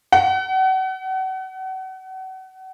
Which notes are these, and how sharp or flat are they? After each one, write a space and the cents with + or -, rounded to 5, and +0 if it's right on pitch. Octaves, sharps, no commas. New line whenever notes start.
F#5 +35